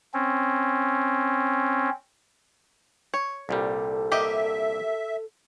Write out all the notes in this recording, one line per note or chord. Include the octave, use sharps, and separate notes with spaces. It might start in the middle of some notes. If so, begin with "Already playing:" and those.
C4 C#4
C#5
C2 A#2 G3 A4
A#3 G4 D#5 E5